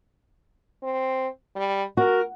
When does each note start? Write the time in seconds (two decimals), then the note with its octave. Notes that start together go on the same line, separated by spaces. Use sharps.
0.83 C4
1.56 G3
1.97 F#4 A#4